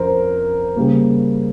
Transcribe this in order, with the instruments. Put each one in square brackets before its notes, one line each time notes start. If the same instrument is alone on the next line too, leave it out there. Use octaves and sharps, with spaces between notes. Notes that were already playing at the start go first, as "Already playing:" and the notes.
Already playing: [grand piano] F2 C#4 A#4 C5
C#3 G3 A#3